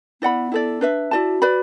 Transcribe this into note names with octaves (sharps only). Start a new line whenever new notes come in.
B3 E4 D5 F#5 B5
E4 A4 D5
D4 B4 E5
E4 F#4 D5 A5
B4 D5 B5